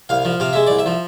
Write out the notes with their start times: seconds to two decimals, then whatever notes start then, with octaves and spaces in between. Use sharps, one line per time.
0.09 C2 F5
0.25 F3
0.40 C3 F5
0.53 G#3 E5
0.67 C2 D5
0.79 E5
0.86 F3